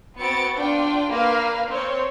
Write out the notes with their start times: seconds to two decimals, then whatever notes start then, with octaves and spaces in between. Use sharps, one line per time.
0.18 B3 C4 F#4 A6 C#7 D7
0.56 D4 F4 G5
1.09 A#3 A#4 B4 F5
1.68 C4 C#5